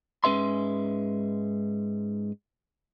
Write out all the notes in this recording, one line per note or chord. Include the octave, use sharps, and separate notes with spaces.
G#2 G#3 C#4 B4 E5 C6